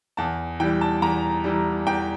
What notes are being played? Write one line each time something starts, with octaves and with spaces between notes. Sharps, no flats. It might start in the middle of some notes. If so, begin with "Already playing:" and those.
E2 A5
E3 G3 G5
A5
E2 A#5
E3 G3
E2 G5